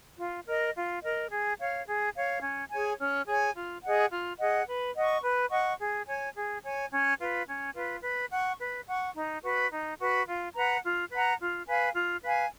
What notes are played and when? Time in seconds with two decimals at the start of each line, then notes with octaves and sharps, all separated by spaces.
0.19 F4
0.47 A#4 D#5
0.76 F4
1.03 A#4 D#5
1.31 G#4
1.60 C#5 F5
1.88 G#4
2.16 C#5 F5
2.42 C#4
2.71 G#4 C#5 G#5
2.99 C#4
3.27 G#4 C#5 G#5
3.55 F4
3.84 G#4 D#5 F#5
4.11 F4
4.39 G#4 D#5 F#5
4.67 B4
4.95 D#5 F#5 C#6
5.24 B4
5.51 D#5 F#5 C#6
5.79 G#4
6.07 C#5 G#5
6.36 G#4
6.64 C#5 G#5
6.92 C#4
7.20 F4 B4
7.48 C#4
7.75 F4 B4
8.03 B4
8.32 F#5 C#6
8.59 B4
8.88 F#5 C#6
9.15 D#4
9.44 F#4 B4
9.71 D#4
10.00 F#4 B4
10.27 F4
10.55 B4 F#5 A#5
10.83 F4
11.12 B4 F#5 A#5
11.40 F4
11.67 B4 F5 G#5
11.95 F4
12.23 B4 F5 G#5